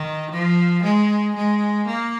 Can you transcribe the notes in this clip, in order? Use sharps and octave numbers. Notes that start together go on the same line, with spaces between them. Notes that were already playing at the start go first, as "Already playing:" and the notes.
Already playing: D#3
F3
G#3
G#3
A#3